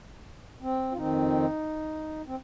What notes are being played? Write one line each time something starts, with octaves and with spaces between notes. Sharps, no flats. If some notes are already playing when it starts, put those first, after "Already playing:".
C4
F4
F2 D#3 C4 D#4
C4